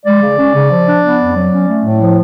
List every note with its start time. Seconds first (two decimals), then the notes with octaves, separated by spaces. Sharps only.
0.05 G#3 D5
0.21 C#3
0.38 C#4
0.54 C#3
0.71 F3
0.87 D4
1.02 B3
1.19 F2
1.35 F#3
1.51 C#4
1.67 A3
1.84 A2
2.00 F3